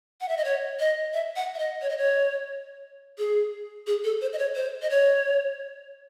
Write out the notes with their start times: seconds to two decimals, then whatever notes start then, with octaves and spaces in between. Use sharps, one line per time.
0.21 F#5
0.29 E5
0.37 D#5
0.44 C#5
0.80 D#5
1.13 E5
1.36 F#5
1.55 E5
1.59 D#5
1.82 C#5
1.89 D#5
1.98 C#5
3.18 G#4
3.87 G#4
4.04 A4
4.21 C5
4.33 D#5
4.38 C#5
4.55 C5
4.82 D#5
4.90 C#5